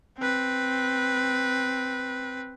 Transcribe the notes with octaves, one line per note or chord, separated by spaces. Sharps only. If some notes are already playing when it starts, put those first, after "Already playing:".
C4 B4